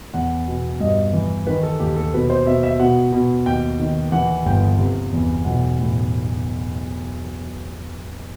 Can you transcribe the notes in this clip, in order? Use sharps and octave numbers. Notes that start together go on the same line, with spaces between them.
E2 F#5
B2
G2 D#5
E3
D#3 B4
A4
D#2 G4
A4
B2 B4
C5
B2 E5
E5
B2 F#5
B2
D#2 G5
D#3
E3 F#5
G1 G5
C3
E2
B1 F#5
A2